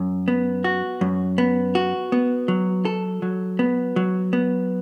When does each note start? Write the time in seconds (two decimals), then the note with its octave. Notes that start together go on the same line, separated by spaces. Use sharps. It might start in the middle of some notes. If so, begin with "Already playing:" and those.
Already playing: F#2
0.28 B3
0.64 F#4
1.01 F#2
1.38 B3
1.75 F#4
2.12 B3
2.48 F#3
2.85 A4
3.22 F#3
3.59 B3
3.96 F#3
4.33 B3